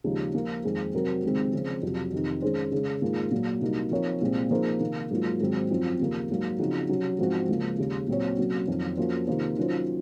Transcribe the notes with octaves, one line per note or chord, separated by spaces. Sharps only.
D#2 C#3 F3 G#3 D#4
F3 A#3 F4
F2 D#3 G#3 C4
C3 F#3 C4 F#4 A#4
C#2 C3 D#3 G#3 C4
C#3 F3 C4
F2 C3 F#3
F2 C3 D#3
D#3 G#3 C#4 G#4 C5
C#3 G#3 C#4
G#2 D#3 A#3 F4 G#4
A#2 F#3 A#3
C2 C3 F#3 A#3 D#4
F3 C4 D#4 A#4 C#5
C2 A#2 G#3 C4 F4
F3 A#3 D#4 G#4 C5
C3 D#3 A#3
G#2 F#3 A#3 F4
G#2 D#3 F#3 C4
F#2 F3 C4 F4 C5
D#2 C#3 F3 A#3
G#2 F#3 A#3
C#3 F3 C4 D#4 F#4
C3 F#3 C#4
G#2 F3 G#3 C4 F#4
C#2 C#3 F3 A#3
D#2 C#3 G#3
A#2 F#3 C4 F#4 C#5
C3 F#3 A#3 C#4
F2 D#3 F#3 C4
F3 A#3 C#4 F#4 C5
C3 D#3 A#3 F4 C5
D#3 F#3 C#4 F4 C5